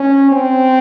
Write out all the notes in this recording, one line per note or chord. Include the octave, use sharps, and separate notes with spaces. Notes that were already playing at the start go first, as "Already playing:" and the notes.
Already playing: C#4
C4